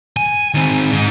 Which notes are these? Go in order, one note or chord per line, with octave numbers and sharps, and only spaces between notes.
G#5
D#3 C4
G#2 D#4